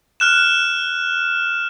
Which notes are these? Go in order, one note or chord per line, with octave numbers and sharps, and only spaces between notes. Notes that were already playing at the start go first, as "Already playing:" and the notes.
F6 F#6 E7